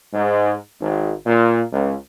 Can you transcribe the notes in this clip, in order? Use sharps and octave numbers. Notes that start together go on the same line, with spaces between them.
G#2
G#1
A#2
C#2